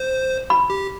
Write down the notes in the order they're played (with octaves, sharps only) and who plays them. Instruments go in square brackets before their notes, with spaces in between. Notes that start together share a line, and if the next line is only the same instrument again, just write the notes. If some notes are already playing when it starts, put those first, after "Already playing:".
Already playing: [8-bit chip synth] C5
[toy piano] B5
[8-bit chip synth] G4